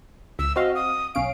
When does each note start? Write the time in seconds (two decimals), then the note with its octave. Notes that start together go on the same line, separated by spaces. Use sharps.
0.39 C#2 E6
0.56 C4 F#4 D#5 F5
0.75 D#6
1.15 B1 C#4 F5 D7